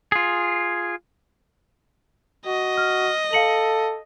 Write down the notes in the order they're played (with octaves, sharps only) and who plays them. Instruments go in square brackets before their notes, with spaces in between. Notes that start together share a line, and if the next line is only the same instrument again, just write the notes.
[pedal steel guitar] F4 G#4
[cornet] F#4 [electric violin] D#5
[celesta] F6
[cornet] A4 [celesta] F5 C#7 F#7